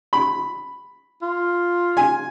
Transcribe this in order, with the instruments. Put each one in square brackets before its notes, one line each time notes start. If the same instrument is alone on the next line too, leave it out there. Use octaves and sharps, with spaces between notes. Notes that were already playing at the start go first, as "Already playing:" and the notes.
[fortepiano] B5
[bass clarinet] F4
[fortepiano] G#5